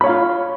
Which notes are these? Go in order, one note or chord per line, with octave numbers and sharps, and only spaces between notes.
F4 C#5 F5 B5